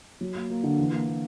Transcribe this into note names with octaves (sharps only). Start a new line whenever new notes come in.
F#3
A#3
A#3
D3
E3
A#3
A#3